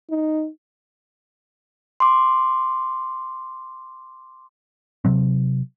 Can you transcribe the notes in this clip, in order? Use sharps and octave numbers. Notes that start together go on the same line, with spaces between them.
D#4
C6 D6
C3 F#3 C4